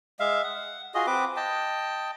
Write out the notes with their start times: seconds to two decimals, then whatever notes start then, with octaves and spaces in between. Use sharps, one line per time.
0.20 G#3 E5 F5
0.43 F#5
0.94 F4 F#4 G#4 D#5
1.07 C4 B4 D6
1.36 D#5 G5 A5